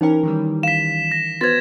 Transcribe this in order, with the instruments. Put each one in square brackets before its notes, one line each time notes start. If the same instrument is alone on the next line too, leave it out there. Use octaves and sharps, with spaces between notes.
[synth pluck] E3 C#4 A#4 [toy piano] D#4 C5 G5
[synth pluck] D#3 E3 G3
[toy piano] F5 [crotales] B6 E7
[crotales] A#6
[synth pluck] B3 [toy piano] F#4 B4 C5 [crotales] G#6 A6